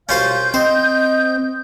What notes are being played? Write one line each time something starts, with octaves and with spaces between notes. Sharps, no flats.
C2 B2 C#4 F4 C5 F5 G6
C4 C5 D#5